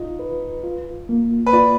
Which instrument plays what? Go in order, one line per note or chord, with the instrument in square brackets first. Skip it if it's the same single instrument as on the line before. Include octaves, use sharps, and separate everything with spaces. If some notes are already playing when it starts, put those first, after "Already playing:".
Already playing: [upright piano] D#4 [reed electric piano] F4
[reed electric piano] B4
F4
A#3
[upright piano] B4
[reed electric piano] F4 [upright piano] D5